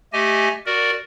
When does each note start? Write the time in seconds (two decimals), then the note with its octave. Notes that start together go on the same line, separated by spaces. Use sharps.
0.13 A3 G4 D#5 G#5
0.66 F#4 A#4 D5